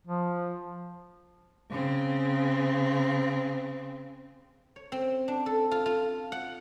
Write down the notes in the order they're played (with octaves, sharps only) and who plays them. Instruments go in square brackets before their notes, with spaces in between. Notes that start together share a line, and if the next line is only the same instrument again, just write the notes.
[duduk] F3
[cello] C#3 C4
[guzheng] C#5
C4
D4
A4
F4
F4
F#5